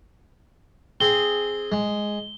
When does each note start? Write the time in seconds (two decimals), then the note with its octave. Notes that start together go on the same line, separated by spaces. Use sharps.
1.00 C4 G#4 G7
1.72 G#3